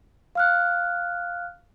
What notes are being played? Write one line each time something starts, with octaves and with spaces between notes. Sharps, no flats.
F5 F6 F#6